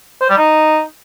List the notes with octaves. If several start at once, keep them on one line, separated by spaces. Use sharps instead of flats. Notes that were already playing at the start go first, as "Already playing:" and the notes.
C5
G3
D#4